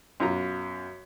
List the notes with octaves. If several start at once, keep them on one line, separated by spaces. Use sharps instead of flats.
F#2 B2 F4 A#5